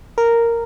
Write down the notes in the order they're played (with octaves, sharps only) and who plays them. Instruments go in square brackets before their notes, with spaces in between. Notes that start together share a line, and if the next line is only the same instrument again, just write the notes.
[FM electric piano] A#4